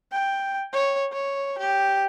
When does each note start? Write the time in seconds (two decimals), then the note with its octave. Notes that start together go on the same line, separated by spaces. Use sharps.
0.12 G5
0.73 C#5
1.13 C#5
1.58 G4